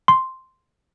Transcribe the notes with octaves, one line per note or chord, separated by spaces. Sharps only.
C6